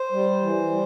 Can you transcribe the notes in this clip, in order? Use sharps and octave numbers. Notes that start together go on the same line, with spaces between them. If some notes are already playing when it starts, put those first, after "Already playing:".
Already playing: C5
G3
E3
G3